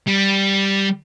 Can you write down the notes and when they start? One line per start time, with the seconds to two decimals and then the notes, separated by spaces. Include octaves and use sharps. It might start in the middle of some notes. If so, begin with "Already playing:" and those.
0.07 G3